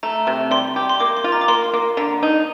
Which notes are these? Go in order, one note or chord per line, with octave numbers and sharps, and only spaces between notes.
A3 A#5
C3
G3 C6
G4
C6
A#3 D6
C6
F4
A#5
D6
A#3 C6
A#3
D3 A#5
D#4